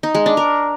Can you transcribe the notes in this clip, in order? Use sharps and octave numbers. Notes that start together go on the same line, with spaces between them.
D#4
G#3
D4
A#4